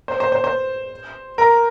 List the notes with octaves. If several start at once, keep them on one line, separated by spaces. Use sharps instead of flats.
C5
C5
C5
C5
A#4